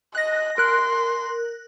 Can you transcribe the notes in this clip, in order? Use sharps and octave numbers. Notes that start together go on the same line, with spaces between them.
D#5 F#6 A#6
A#4 C6 F#6